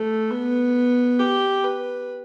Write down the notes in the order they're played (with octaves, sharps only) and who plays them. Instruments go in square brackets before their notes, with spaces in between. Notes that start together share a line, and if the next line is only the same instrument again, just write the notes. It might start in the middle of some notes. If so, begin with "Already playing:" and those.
Already playing: [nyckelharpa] A3
B3
G4
B4